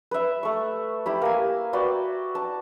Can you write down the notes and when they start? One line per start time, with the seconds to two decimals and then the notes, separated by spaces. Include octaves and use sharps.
0.11 B4 E5
0.43 A3 C#6
1.06 E4 G4 B5
1.22 A#3 G#5
1.73 F#4 B4 D5 G5
2.35 A5